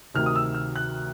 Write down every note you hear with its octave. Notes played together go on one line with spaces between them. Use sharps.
D2 C3 D#3 F6
D#6
E6
F6
F#6